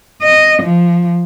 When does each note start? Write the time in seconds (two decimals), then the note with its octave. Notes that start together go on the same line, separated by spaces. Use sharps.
0.22 D#5
0.63 F3